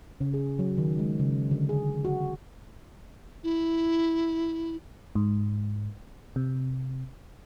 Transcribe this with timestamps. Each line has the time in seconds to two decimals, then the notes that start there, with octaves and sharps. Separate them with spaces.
0.21 C#3
0.34 G#4
0.59 F#3
0.78 D#3
0.99 G#3
1.20 C#3
1.51 D3
1.69 G#4
2.05 F#4
3.44 E4
5.15 G#2
6.36 C3